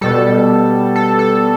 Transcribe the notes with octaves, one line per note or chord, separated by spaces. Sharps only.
B2 G3 A4
A4
A4